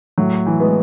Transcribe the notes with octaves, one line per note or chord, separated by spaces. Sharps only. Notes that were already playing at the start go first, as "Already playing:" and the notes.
A2 F#3
E3
G#3 B3